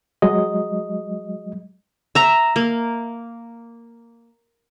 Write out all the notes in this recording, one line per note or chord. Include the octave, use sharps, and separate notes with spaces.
F#3 G#3 D#5
E5 A#5
A#3